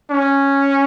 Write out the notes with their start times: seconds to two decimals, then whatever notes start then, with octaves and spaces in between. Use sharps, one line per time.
0.11 C#4